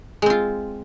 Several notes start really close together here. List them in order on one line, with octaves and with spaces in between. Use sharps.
G#3 C4 F4